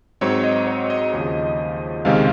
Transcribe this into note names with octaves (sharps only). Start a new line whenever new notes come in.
G#2 F#3 C4 C#5
D#5
C#5
D#5
D#2 C#3 F3
C#2 C3 D#3 G#3 C#4 F5